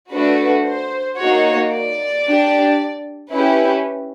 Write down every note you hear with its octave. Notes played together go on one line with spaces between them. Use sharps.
A3 D4 F#4 B4
C5
A#3 D#4 F#4 C#5
D5
D4 G4
C#4 E4 G4 B4